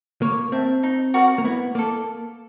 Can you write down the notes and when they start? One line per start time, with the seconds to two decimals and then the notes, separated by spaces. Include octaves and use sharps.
0.22 A#3 C#5
0.52 C4 E5 A5
0.83 D#4
1.14 F#4 A#4 D5
1.38 A#3
1.45 B3 E4
1.75 A#3 A4 D5